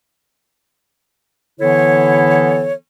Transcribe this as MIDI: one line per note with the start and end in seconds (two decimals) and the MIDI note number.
1.60 2.73 50
1.60 2.73 52
1.60 2.73 59
1.60 2.73 64
1.60 2.73 69
1.60 2.73 73